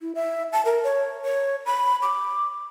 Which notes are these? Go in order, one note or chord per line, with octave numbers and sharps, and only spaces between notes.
E4
E5
A5
A#4
C#5
C#5
B5
D6